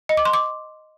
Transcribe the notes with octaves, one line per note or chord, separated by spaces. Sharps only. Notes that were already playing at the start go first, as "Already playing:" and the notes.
D#5
D6
C6
D6